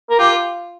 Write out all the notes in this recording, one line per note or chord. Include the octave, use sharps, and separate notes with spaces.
A#4
F4 G4